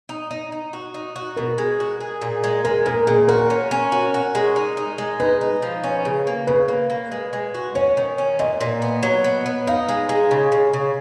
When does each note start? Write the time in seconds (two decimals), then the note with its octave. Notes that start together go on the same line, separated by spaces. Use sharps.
0.09 D#4
0.31 D#4
0.52 D#4
0.73 F#4
0.94 D#4
1.16 F#4
1.36 B2 A#4
1.58 G#3
1.80 F#4
2.01 G#4
2.21 A#2
2.44 G#3
2.64 G#3 A#4
2.86 A#2 A#4
3.07 A#2 G#4
3.28 F#4 A#4
3.50 C#4
3.71 C#4
3.92 F#4
4.14 F#4
4.35 G#3
4.56 D#4
4.77 D#4
4.98 G#3
5.20 D#4 B4
5.41 D#4
5.62 F3
5.84 C#4
6.05 C#3
6.27 A#3
6.47 C#3 B4
6.68 A#3
6.90 A#3
7.12 G#3
7.33 G#3
7.54 F#4
7.75 C#4 C#5
7.97 D#3
8.18 C#4
8.39 A#2 D#5
8.61 A#2
8.82 B3
9.03 F#3
9.24 B3
9.46 B3
9.67 D#4 F5
9.89 G#3
10.09 G#3
10.31 C#3
10.52 C#3
10.73 C#3